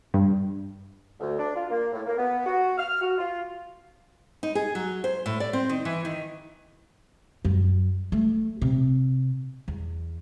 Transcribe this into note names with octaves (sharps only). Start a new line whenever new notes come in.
G2
D2
D4
F4
A#3
A2
A#3
B3
F#4
F6
F#4
F4
D#4
G#4
F#3
C5
A2
D5
C4
D#3
E3
D#3
F#2
A3
C3
E2